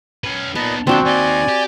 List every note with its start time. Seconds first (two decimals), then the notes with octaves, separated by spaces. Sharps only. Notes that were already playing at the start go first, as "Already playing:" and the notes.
0.24 C#4 B4
0.55 A#2 B3 D#4 D#5 A5 B5
0.87 D#2 B2 F3 C4 D4 F#4 G5 A5
1.05 D#2 D#4 D5 G#5
1.48 G4